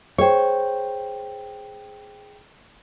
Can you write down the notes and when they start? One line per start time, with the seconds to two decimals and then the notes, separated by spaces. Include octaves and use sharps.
0.18 G#4 C5 C#5 G5